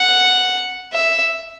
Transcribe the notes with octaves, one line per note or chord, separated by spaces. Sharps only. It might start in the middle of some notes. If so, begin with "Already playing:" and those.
Already playing: F#5
E5